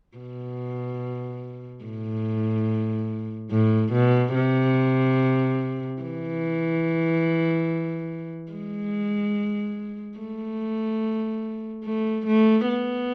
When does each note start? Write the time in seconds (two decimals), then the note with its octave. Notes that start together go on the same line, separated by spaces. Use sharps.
0.18 B2
1.84 A2
3.51 A2
3.93 B2
4.35 C3
6.02 E3
8.52 G#3
10.19 A3
11.85 A3
12.27 A3
12.68 B3